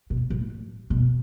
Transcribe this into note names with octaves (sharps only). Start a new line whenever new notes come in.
B2
A2
B2